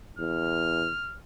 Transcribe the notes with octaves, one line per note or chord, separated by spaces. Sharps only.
E2 F6